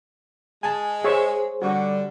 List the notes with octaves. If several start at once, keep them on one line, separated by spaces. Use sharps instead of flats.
G#3 G#5 A5
G#4 C5 C#5 E5 C#6
D3 G3 F#4